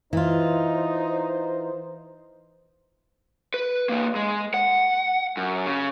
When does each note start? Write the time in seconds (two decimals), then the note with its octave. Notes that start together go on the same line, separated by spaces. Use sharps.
0.13 E3 D#4 F4 C5
3.54 B4
3.89 E3 A#3
4.15 G#3
4.54 F#5
5.37 F#2
5.66 C#3